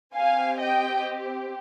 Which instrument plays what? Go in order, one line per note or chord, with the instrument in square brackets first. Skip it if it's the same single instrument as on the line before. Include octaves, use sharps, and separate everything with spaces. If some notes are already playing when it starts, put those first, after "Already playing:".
[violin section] C4 G4 F5 G#5
D#5 G5